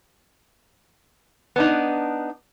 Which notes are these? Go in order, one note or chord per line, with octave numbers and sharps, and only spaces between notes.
B3 D4 D#4